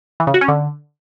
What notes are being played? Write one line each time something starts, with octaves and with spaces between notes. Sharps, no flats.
E3
C#3
F#4
C#4
D3